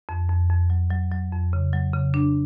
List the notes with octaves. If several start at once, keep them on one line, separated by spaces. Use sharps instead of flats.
F2
F2
F2
F#3
F#3
F#3
F2
C#3
F#3
C#3
D4